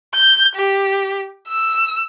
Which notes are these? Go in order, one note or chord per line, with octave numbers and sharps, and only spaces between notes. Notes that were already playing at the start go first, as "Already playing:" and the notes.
G6
G4
E6